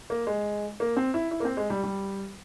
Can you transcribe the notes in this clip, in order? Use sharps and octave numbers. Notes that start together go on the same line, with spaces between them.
A#3
G#3
A#3
C4
E4
E4
A#3
C4
G#3
G3
G3